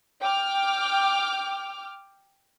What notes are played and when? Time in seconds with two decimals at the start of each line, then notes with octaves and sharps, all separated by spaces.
0.21 G5 D6 F6